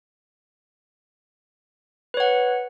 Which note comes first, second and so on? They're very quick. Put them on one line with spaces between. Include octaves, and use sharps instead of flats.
B4 C#5 F#5